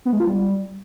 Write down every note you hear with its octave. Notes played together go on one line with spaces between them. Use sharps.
B3
G#3
F4
G3